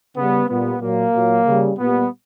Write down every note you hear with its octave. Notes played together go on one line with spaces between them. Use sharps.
C#3 G3 B3
A#2 G3 B3
A#2 F#3 A#3
A#2 F#3
C#3 G3
A#2 G3 B3